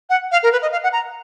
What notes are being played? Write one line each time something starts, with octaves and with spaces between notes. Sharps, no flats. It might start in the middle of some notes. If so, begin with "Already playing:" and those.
F#5
F5
A#4
B4
D#5
F5
F#5
A#5